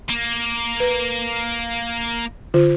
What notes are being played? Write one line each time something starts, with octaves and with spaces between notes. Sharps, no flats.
A#3
B4
D3 F4